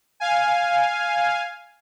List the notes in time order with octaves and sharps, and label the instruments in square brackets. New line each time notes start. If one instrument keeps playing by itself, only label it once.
[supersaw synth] F5 G#5